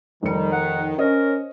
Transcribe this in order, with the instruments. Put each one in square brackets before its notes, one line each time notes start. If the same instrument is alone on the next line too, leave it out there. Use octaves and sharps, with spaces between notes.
[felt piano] F1 C#7 [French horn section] D#3 [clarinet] G3
[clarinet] F#5
[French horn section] C#4 [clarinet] A#4 [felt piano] C5 C#5 D#5